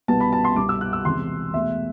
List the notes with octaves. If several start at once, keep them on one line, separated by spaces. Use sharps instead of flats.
C2 B2 G3 B3 A5
B5
A5
C6
C2 B2 G3 B3 D6
E6
F#6
E6
E1 E2 C3 C6
E2 B2 A3 E5